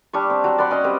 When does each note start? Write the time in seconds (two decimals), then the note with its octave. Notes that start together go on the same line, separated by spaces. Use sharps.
0.13 G3 D4 C#6
0.30 C4
0.44 F#3 A#5
0.58 D5 F#5 B5 C6
0.71 C#4 D#5 C6
0.84 G3 C4 B4